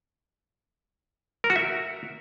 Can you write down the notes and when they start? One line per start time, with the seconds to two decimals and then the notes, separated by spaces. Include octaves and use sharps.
1.44 A#4
1.50 F#4
1.56 E5